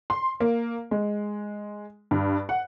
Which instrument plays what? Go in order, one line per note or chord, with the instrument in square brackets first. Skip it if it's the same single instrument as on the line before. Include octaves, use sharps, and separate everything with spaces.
[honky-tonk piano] C6
A#3
G#3
G2
F#5